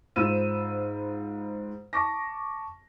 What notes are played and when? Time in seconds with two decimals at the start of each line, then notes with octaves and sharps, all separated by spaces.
0.16 G#2 F4 C5 B5 E6 D#7
1.93 A5 C#6 D6 A#6